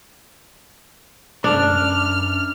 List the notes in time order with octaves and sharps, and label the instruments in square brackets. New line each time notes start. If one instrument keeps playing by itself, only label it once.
[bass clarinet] F#2 [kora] D4 [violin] F6